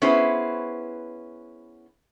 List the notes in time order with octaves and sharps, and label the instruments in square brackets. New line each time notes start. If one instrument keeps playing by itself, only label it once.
[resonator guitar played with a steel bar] B3 C#4 E4 G#4 B4 C5